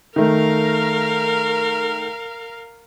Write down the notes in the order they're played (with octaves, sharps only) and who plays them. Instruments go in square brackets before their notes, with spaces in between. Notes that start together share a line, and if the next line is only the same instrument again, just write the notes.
[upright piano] D#3 A3 [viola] A#4 F5